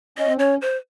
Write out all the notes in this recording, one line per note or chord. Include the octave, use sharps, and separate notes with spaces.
C#4 D#5
C4
C#4 C#5
C5